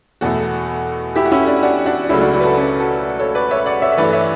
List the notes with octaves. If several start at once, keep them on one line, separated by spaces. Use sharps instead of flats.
E2 B2 A3 F#4 A4
E4 G4
F#4
C#4 E4
D4 F#4
D4 F#4
D4 F#4
C#2 C#3 F#3 A3 C#4 E4
D4 F#4
D4 F#4
B4
F#4 A4
C#4
F#4 A4
A4 C#5
B4 D5
C#5 E5
D5 F#5
C#5 E5
E5
G2 E3 A3 B4 D5
C#5 E5